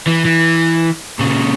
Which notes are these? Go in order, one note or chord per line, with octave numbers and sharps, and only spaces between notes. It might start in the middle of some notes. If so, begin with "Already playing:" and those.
E3
E3
A#2 C#3